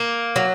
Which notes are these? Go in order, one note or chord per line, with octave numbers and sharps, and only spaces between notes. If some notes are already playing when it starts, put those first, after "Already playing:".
Already playing: A#3
F#3